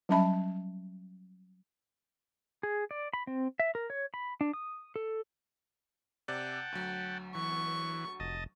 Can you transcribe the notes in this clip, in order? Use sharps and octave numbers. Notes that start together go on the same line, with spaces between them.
F#3 G3 C#4 E5 A5 B5
G#4
D5
B5
C4
E5
A#4
C#5
B5
D4
D#6
A4
C3 D5 F#5 G5 A5
D2 F#3
E3 C#6
F1 D#5 A5